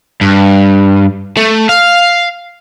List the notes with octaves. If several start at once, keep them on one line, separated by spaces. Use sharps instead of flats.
G2
A3
F5